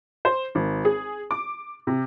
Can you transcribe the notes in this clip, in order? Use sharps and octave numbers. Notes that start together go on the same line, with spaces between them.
C5
G#1
G#4
D6
C3